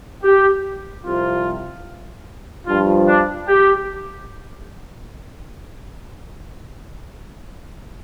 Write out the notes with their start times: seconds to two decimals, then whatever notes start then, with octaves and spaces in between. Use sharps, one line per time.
0.24 G4
1.04 C2 C3 F3 F4
2.67 G2 F3 F4
3.08 D4
3.48 G4